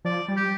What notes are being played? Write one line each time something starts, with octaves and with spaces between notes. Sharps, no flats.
F3 D5
G3
G4